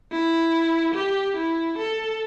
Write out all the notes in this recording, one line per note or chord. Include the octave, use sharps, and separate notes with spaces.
E4
G4
E4
A4